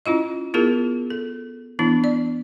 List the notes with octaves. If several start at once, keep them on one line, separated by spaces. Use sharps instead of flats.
C#4 E4 F4 D#5
B3 E4 F4 G#4 A#4
A4
E3 B3 D4 E4
D5